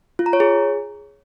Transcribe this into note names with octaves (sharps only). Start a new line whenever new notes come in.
F4
A#5
C#5
G#4